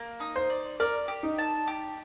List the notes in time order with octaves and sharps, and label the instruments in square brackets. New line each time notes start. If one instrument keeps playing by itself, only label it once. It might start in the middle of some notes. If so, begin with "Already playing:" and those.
Already playing: [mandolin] A#3
D#4
[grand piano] C5
[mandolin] D5
[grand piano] A#4 [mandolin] D5
[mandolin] G4
[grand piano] D#4
[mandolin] A5
G4